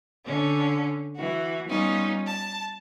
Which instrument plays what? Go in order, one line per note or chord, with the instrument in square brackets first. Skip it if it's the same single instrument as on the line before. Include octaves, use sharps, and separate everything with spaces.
[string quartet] D3 C#4
E3 F#4
G3 B3 C#4 D#4 F4
A5